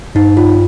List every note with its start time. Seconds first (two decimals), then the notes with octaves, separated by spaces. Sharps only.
0.15 G2 D#4
0.37 F4